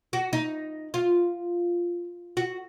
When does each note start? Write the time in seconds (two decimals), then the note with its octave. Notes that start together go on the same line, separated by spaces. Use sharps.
0.13 F#4
0.33 D#4
0.94 F4
2.37 F#4